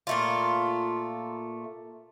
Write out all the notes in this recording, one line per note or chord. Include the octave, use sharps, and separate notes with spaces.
A#2 A3 F4